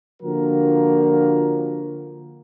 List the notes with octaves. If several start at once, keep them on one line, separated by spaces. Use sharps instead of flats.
D3 F3 A#3 F4 F#4 A#4